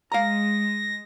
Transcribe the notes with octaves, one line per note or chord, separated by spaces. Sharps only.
G#3 F5 A#5 A#6